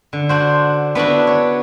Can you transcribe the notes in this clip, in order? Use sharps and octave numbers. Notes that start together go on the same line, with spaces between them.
D3
D4 F#4 C5
B3 D4 E4 F#4
C#5